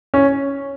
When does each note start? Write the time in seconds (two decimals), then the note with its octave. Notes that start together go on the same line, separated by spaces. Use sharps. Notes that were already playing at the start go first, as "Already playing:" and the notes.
0.14 C#4